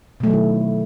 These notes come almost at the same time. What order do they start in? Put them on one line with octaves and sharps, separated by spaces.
B2 A3 F#3 D#3 E4